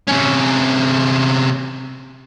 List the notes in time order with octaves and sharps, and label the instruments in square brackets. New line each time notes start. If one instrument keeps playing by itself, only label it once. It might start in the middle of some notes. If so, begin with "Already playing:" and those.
[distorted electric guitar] C3 C#4